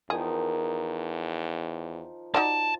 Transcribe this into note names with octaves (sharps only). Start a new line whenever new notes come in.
E2 D#3 F3 D#4 G#4
D#4 F#4 D5 A5